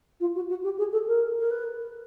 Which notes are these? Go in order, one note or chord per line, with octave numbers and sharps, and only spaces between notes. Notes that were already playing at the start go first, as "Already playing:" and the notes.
F4
F#4
F#4
G4
G#4
A4
A#4
A#4
B4